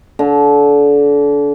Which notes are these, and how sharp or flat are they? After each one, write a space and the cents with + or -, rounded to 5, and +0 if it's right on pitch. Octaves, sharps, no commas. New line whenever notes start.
D3 -30